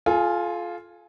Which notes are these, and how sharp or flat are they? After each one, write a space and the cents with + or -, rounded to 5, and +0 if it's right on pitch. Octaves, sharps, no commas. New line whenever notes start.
F4 +0 A4 -40 G#5 -5